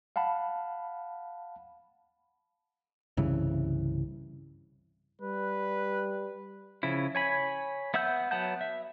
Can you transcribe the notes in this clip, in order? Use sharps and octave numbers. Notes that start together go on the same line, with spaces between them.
F5 F#5 A5 B5
C2 G2 C#3 E3
G3 B4
C#3 F3 E4
C#5 G#5 B5
B3 E5 F#5 E6 G6
F#3 B3 F#5 A5 G6
E5